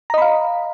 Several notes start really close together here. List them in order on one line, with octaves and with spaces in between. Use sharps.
A#5 D#5 B5 F5